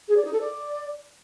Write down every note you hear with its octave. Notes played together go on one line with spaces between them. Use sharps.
G#4
D5
D#4
A4
D5